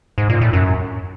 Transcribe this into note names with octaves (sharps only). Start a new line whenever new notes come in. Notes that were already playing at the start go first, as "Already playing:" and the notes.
G#2
A#2
A2
F#2